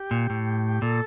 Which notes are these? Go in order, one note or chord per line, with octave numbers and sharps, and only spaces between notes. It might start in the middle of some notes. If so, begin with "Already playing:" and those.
Already playing: G4
A#2
A2
A#2 A4